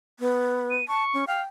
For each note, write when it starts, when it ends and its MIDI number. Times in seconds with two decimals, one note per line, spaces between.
0.20 0.76 59
0.70 0.85 99
0.88 1.04 81
0.88 1.25 85
1.14 1.24 61
1.27 1.41 77
1.27 1.44 79